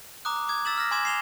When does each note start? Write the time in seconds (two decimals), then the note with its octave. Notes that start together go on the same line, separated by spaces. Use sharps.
0.25 A#5 D6 D#6 F#6
0.48 D6 D#6 G#6
0.65 E6 A6 B6 E7 F#7
0.78 F6 A#6
0.91 G#5 C6 D6 G#6 E7
1.05 C7 E7 F7 G7